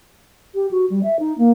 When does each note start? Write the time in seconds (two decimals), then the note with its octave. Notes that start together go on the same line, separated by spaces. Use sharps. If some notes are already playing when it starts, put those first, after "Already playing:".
0.55 G4
0.71 F#4
0.90 G3
1.03 E5
1.20 D#4
1.38 A#3